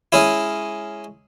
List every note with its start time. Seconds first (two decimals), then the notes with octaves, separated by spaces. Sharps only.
0.12 G#3 C#4 E4